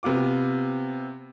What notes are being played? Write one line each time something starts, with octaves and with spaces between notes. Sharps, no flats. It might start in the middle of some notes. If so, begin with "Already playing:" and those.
C3 B3 F4 D6